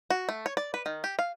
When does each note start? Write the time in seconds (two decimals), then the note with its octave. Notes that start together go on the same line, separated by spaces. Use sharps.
0.10 F#4
0.29 A3
0.46 C#5
0.57 D5
0.74 B4
0.86 D#3
1.04 G4
1.19 F5